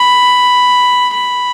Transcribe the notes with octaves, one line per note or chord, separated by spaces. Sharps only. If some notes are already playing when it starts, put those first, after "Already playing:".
Already playing: B5
B5